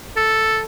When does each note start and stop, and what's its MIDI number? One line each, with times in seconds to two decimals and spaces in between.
0.17 0.62 69